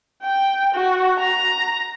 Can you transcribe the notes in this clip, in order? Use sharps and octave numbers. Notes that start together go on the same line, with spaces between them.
G5
F#4
A#5